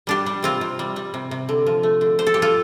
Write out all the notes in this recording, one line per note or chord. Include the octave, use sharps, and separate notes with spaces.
G3 D4 G4
G3
C3 C4 F4
C3
G3
G3
C3
C3
D3
F3
A3
D3
D3 C5
A4
F3 G4
F4 A4